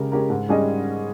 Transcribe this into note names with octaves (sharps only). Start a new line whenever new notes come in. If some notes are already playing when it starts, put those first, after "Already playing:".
Already playing: C#3 G#3 C#4 G4 A#4
G#3 C#4 G4 A#4
G#2
G3 C#4 G#4 D#5